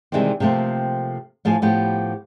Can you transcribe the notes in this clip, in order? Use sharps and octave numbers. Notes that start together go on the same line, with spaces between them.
C3 D#3 E3 G3 G#3 C4
C3 F3 A3 A#3 C4
A2 F3 B3 F5 G#5
A2 F3 B3 G4